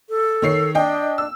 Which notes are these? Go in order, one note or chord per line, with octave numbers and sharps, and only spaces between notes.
A4
D#3 C#5 C7
D4 D#5 G5
E6